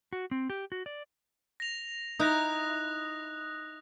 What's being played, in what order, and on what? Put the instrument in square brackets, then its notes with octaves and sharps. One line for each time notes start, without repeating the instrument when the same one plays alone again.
[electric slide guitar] F#4
C4
G4
F#4
D5
[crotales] A#6 F7
[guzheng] D#4 E4 [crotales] D#6 F#6 A#6